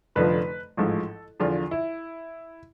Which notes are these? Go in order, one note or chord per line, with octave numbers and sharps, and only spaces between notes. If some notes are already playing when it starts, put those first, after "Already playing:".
F1 F2 D3 F3 B4
A1 G#2 F3 A4
E2 D3 F3 F4
E4